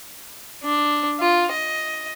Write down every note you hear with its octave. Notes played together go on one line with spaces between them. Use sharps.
D4
F4
D#5